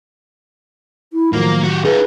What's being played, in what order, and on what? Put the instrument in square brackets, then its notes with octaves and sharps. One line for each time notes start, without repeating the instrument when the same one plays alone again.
[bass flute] E4
[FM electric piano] A2 D#3 F#3 [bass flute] F3 [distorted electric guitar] A#3
[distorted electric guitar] F#4 G4
[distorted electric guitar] D#4 F4 [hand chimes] G#4 [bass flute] B4